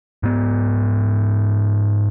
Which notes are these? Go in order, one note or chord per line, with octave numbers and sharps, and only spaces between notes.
G#2 B3